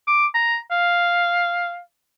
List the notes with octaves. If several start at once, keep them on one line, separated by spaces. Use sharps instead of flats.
D6
A#5
F5